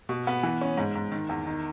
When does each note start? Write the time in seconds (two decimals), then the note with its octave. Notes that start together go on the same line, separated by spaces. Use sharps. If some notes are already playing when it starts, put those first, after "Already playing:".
0.09 B2
0.27 B3
0.43 E3
0.61 C#4
0.77 G#2
0.95 G#2
1.12 D#3
1.29 E2
1.46 D#3